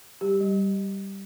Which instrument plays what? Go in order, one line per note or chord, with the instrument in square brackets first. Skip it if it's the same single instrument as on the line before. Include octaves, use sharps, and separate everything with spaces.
[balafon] G3 G4
G3